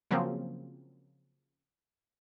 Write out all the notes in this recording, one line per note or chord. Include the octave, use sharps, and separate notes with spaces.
C#3 F3 F#3 A#3 C4